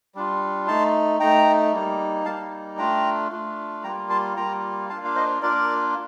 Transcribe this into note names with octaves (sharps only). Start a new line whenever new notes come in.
G3 D4 F4
A3 D#4 A5 C6
A3 D#4 G5 A#5
G3 A#3 D#4
G3 A#3 D#4 F5 A5
A3 D4 F4 G5 A#5
A3 D4 F4
G3 A#3 F4 G5 A#5
A5 C6
G3 A#3 F4 G5 A#5
A#3 D4 F4 F5 A5
F5
C5 D#5
A#3 D4 F4 A#4 D5